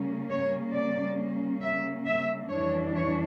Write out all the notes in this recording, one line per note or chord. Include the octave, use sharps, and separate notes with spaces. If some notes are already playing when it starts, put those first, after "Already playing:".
Already playing: C#3 G3 A#3 C#4
C#5
D5
E5
E5
F2 E3 G3 D4 C#5
C#5